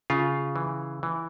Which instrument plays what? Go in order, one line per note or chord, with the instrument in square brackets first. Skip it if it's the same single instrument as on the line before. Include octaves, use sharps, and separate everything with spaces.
[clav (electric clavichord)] C#3 F4
E3
E3